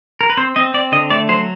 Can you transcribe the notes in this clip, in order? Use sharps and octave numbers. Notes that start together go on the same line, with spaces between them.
A#4
B4
C4 C5
C4 D#5
C4 D5
D3 D#5
A3 D5
F#3 C5